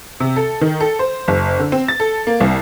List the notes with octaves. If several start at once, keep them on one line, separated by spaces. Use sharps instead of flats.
C3
A4
D#3
A4
C5
F#1
D3
C4
A6
A4
A#3
C2